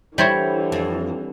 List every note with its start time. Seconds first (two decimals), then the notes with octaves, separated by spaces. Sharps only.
0.18 D3 E3 G3 E4 C5 C#5
0.72 F2